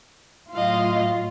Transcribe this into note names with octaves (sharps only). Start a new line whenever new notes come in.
A2 F#3 F4 D#5 F5